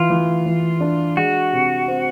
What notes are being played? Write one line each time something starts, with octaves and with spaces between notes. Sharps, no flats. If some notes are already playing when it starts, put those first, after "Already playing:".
Already playing: E3 F4
E3
E3
D4
G#3 F#4
C3
C4